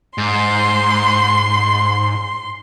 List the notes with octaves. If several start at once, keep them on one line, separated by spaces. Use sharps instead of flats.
G#2 C6